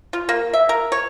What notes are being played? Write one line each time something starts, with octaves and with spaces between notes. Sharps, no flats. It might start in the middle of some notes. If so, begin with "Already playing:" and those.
F4
A#3
E5
A#4
C#5